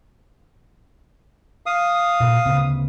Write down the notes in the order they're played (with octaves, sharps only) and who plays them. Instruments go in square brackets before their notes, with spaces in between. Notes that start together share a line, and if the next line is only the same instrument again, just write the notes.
[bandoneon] F5 D#6
[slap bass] A#2
D2 C#3 B3